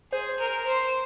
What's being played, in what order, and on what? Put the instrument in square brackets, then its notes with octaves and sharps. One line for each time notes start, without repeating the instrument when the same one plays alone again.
[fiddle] G#4 [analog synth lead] C5
[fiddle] A#4
C5